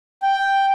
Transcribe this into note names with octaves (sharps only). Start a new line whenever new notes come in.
G5